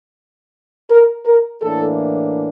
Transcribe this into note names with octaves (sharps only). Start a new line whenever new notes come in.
A#4
A#4
A2 E3 A#3 D4 A4